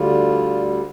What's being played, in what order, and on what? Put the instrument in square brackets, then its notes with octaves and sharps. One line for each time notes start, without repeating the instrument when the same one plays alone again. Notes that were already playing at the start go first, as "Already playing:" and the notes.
Already playing: [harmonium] D2 D3 G3 F4